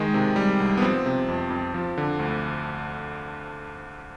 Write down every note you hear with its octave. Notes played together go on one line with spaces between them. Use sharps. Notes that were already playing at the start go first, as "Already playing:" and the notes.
Already playing: D#3 G#3
C3
G3
C2
B3
F3 C4
C3
F2
F2
F3
D3
D2